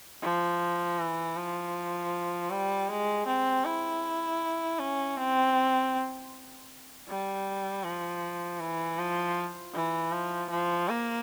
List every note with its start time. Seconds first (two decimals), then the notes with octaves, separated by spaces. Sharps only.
0.22 F3
0.99 E3
1.37 F3
2.51 G3
2.89 G#3
3.27 C4
3.65 E4
4.79 C#4
5.17 C4
7.08 G3
7.84 F3
8.60 E3
8.98 F3
9.75 E3
10.12 F3
10.50 F3
10.89 A#3